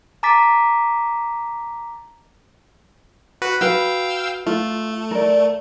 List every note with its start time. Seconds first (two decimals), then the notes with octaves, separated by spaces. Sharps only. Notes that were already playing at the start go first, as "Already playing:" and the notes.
0.23 A5 A#5 D6 A6 B6
3.42 F#4 B4
3.61 F#4 B4 F5 G5 E6
4.46 A3 F4
5.11 A#4 D5